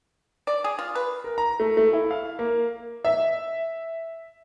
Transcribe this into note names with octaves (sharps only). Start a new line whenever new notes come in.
D5
G#4
F4
B4
A#4
A#5
A3
A3
E4
F5
A#3
E5